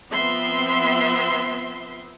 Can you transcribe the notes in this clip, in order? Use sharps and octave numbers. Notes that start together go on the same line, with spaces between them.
F3 B3 C4 E5 C6